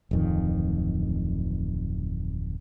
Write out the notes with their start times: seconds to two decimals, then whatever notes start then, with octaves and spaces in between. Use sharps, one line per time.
0.11 D1 F2 D#3